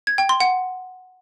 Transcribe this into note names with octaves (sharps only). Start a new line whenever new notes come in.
G#6
G5
C6
F#5